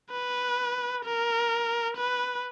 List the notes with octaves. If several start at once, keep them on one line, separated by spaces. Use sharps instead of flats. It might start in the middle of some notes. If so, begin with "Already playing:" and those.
B4
A#4
B4